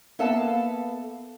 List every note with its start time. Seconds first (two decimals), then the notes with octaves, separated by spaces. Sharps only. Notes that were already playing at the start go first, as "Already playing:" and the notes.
0.19 A#3 B3 A4 E5 F5 A5